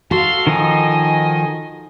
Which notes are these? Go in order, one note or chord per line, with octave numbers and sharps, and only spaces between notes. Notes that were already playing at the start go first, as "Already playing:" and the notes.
F#4 A4 F5 C6
D#3 F3 D#4 D#5 G#5